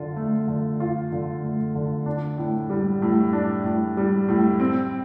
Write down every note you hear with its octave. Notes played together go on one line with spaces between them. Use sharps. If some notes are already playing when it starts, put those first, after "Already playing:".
Already playing: D3 F4
A3
D3
F4
D3
A3
D3
D4
A2
G3
A2
D4
A2
G3
A2
C4